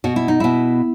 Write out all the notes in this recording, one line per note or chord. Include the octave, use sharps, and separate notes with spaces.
B2 F#4
E4
D#4
B2 E4